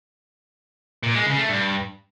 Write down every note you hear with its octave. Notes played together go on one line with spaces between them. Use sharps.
A#2
G#3
C#3
A3
G2